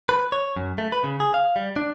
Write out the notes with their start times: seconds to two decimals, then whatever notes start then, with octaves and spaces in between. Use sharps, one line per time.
0.09 B4
0.32 C#5
0.56 F#2
0.78 A3
0.92 B4
1.04 C#3
1.20 G#4
1.34 F5
1.56 G3
1.76 D4